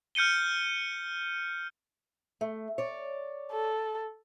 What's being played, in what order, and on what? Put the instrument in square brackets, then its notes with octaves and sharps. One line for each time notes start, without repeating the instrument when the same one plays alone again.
[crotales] F6 G6 C#7 D#7 G7
[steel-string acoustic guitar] A3
C#5 D5
[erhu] A4